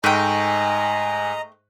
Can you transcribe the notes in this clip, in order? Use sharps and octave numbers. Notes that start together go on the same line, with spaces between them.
G#2 A3 D#5 G5 G#5 A#5 F#6 D#7